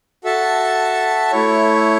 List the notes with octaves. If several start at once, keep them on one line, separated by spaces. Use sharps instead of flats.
F#4 A4 E5 A5
A3 E4 C#5